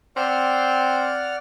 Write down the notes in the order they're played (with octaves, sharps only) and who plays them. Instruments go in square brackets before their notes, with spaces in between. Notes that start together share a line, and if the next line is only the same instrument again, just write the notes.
[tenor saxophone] C4 [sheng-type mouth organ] D5 F#5 F6